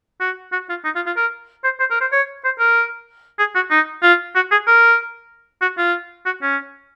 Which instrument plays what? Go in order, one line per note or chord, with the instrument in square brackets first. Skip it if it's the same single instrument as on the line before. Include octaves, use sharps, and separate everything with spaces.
[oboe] F#4
F#4
F4
D#4
F4
F4
A#4
C5
C5
A#4
C5
C#5
C5
A#4
G#4
F#4
D#4
F4
F#4
G#4
A#4
F#4
F4
F#4
C#4